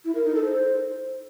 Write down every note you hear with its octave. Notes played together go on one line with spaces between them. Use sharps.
E4
A#4
D#4
A4
C5